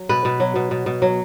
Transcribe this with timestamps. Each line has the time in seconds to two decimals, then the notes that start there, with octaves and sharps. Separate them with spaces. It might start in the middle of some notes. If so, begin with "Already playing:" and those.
Already playing: F#3
0.09 B2 B4
0.25 B2
0.40 F#3
0.56 B2
0.71 B2
0.86 B2
1.02 F#3